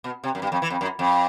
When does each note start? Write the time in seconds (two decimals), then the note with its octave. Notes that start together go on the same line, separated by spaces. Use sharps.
0.04 B2
0.24 C3
0.35 F#2
0.42 G2
0.52 F2
0.62 E3
0.70 F2
0.81 F#2
0.99 F2